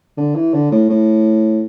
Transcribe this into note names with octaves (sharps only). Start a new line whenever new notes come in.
D3
E3
D3
A2
A2